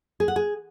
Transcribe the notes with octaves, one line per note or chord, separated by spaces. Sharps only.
G#4
F#5
G#4